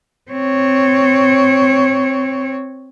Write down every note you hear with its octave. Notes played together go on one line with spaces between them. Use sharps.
C4 C#5